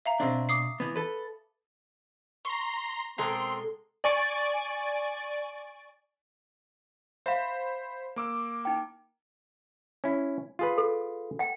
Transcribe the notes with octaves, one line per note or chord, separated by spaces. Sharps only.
E5 F5 A#5
B2 C4 D4
D6 D#6 C7
E3 B3
A4 B4
A#5 C6 C#6
B2 G#3 C4 A4 A#4 C6
D5 G#5 C#6 A6 D7
C5 E5 F5 B5 E7
A#3 D6 E6
D#4 G5
C#4 E4
F4 G#4 B4
A4
F#5 G5